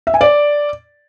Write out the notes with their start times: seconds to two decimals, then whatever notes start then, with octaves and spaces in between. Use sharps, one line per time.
0.07 E5
0.14 G#5
0.21 D5